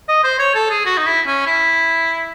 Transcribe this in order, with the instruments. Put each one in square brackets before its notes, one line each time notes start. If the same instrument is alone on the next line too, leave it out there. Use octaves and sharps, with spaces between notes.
[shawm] D#5
C5
C#5
A4
G#4
F#4
D#4
E4
C#4
E4